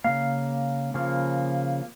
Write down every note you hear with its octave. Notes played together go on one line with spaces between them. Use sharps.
C#3 F3 A#3 F5
C#3 F3 A#3